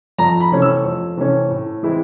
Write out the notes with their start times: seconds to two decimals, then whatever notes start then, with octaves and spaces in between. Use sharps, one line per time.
0.18 F2 A#5
0.40 B5
0.52 C3 E3 A3 C#4
0.62 E6
0.84 F2
1.17 C3 E3 A3 C#4
1.51 A2
1.83 E3 G#3 C4 E4